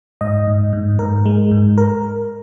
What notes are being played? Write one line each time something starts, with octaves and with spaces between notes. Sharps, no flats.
G#2 D#5
G#2
G#2
G#2 A#4
G#3
G#2
A#4